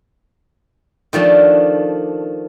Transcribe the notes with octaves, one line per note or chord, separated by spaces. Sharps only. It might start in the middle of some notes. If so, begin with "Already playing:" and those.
D#3 F3 A3 D4